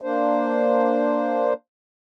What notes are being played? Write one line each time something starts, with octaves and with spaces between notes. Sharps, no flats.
A#3 D4 C5